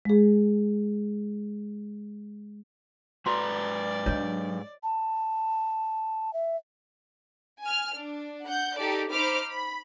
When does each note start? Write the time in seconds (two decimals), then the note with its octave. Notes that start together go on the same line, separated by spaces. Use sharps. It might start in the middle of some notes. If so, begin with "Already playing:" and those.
0.05 G#3 G#4
3.26 G#2 F#4 B4 D5 A#5 C6
4.06 F#3 D4 C#5 D#5
4.83 A5
6.34 E5
7.62 G#5 F6
7.95 D4
8.46 F#5 G6
8.78 D#4 G4 A4 D5
9.12 D#4 C5 B5 D6 F6
9.48 B5